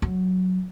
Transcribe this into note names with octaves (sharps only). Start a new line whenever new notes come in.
F#3